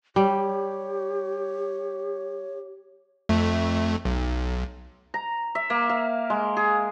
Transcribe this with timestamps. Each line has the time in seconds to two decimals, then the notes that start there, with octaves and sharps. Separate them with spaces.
0.16 G3 G4 C#5
3.29 F2 A3
4.05 B1
5.14 A#5
5.55 E5
5.70 A#3
5.89 F5
6.30 G#3
6.57 G#4